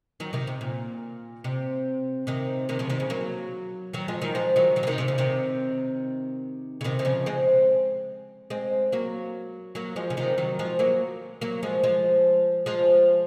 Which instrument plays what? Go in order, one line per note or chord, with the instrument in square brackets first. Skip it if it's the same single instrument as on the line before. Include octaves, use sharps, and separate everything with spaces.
[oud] D#3 F#3
C3 D#3
C3
A#2
C3
C3 D#3
C3 D#3
C#3 F3
C3 D#3
C#3
F#3 A#3
D#3 F#3
F3 G#3
D#3 F#3
F3 G#3
D#3 F#3
D#3 F#3
F3
C3 D#3
C3
C#3
C3 D#3
C#3
C3 D#3
D#3
C#3 F3
G#3 C4
G#3 C4
F#3 A#3
F#3 A#3
F3 G#3
C#3
C3 D#3
D#3 F#3
F3 G#3
F#3 A#3
F#3 A#3
F3 G#3
F3 G#3
F3 G#3